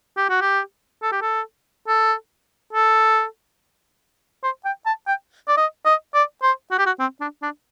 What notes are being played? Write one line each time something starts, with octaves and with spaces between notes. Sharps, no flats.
G4
F#4
G4
A4
G4
A4
A4
A4
C5
G5
A5
G5
D5
D#5
D#5
D5
C5
F#4
G4
F#4
C4
D4
D4